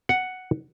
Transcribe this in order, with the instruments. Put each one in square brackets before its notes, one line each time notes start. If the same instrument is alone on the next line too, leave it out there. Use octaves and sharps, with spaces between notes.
[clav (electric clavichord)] F#5